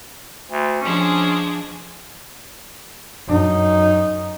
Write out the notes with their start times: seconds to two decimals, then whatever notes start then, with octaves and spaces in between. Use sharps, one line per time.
0.50 D2
0.81 F3 G#3 C#4 D4
3.27 F#2 D#4